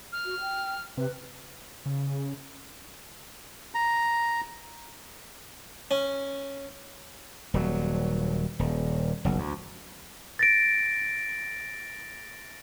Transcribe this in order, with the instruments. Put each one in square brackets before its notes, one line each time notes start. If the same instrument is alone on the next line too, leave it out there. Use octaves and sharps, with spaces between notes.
[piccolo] F6
[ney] F#4
G5
[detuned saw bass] C3 [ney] B4
[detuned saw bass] C#3
[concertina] A#5
[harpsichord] C#4
[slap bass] D#1 F#3
D#1
F#1 B1
D2
[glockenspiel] A6 A#6 D7